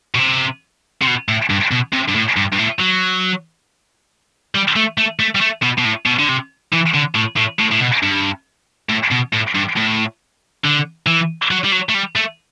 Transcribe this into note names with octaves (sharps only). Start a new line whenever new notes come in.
B2
C3
C3
B2
A2
G2
B2
C3
G2
A2
G2
G2
A2
F#3
G3
A3
A3
A3
G3
A3
B2
B2
A2
B2
D3
C3
E3
D3
A2
A2
A2
A2
B2
G2
A2
B2
A2
G2
A2
D3
E3
F#3
G3
F#3
A3
G3
A3